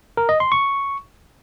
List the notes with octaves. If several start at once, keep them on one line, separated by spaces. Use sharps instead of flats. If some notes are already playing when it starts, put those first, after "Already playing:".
A#4
D#5
C6
C#6